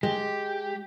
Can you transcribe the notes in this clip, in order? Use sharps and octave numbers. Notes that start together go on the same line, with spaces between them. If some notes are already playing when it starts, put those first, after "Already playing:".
G#3 G4